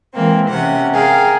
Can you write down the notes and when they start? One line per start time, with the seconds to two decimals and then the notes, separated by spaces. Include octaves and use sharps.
0.15 E3 G#3 A#3 C4
0.50 C3 C#4 G4 F#5
0.92 G#4 A#4 F5 G5